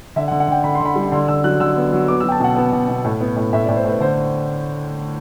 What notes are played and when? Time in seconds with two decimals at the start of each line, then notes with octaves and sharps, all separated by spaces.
0.16 D3 E5
0.28 F#5
0.31 D3
0.40 F#5
0.48 D3 G5
0.64 D3 B5
0.75 C6
0.80 D3 B5
0.96 G3
1.12 D3 C6
1.28 D3 E6
1.44 F#3 F#6
1.60 D3 E6
1.77 B3
1.93 F#3
2.08 B3 D6
2.20 E6
2.24 F#3 G5
2.32 A5
2.40 B2 F#5
2.56 B3
2.72 B2
2.88 B2
3.05 A2
3.21 B3
3.36 A2
3.53 A2 E5
3.65 D5
3.69 A2
3.77 C5
3.85 A2 B4
4.00 D3 C5